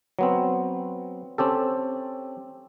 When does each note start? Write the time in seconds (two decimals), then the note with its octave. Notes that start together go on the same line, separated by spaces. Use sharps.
0.19 F#3 B3 C4
1.38 C4 C#4 G4 A4